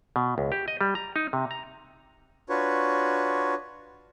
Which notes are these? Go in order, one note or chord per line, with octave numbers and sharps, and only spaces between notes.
B2
C#2
G4
D#5
G3
A#5
D#4
C3
A#5
D4 F4 F#4 B4 C#5